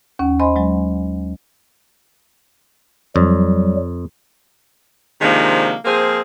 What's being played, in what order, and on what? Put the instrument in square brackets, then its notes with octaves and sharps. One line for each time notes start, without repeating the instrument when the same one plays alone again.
[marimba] D#2 C#4 F#5
C5 D#5 G#5 B5 C6
F#3 G#3
[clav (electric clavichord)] F2 [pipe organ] F#3 G3
[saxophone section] C3 D#3 F3 G#3 A#3 D4
F3 A#3 C4 G#4